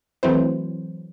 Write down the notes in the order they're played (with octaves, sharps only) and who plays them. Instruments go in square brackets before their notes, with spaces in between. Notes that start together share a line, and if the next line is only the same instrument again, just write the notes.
[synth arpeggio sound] E3 F#3 A3 C4 E4 C5